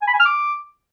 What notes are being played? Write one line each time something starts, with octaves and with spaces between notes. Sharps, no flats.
G#5
B5
G#5
F6
D6